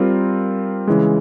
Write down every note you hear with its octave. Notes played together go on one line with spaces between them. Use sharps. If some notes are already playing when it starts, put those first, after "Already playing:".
Already playing: G3 C4 F4 A#4
C#3 E3 G#3